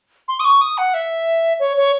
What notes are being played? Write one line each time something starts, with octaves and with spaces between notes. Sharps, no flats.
C6
D#6
C#6
D#6
F#5
E5
C#5
C#5